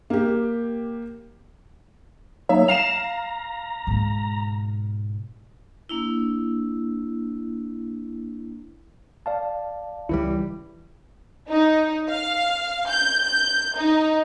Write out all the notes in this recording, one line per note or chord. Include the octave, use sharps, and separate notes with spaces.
A#3 G4
F#3 A#3 D#4 E5
F5 A#5 C7 E7
G#2 B2
A#3 D4 E4
D5 F5 A5
C#2 E3 G3 E4
D#4
F5
G6
G6
D#4